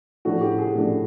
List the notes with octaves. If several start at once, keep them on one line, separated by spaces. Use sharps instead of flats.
A2 F3 A3 D4 F#4
G4
G#4
A2 F3 A3 D4